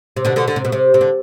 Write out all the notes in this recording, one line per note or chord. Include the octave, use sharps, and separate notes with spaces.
C3
B2 D3
B2 D3
D3
C3
B2
C3
C3
D3